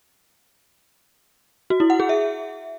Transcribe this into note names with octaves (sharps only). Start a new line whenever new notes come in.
F#4
E4
F#5
G#4
E5